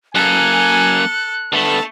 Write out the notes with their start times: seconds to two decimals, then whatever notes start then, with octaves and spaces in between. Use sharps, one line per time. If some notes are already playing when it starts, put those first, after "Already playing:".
0.15 F#2 A#3 A4 G#5 F#6
1.52 D3 A3 B3 A4 A5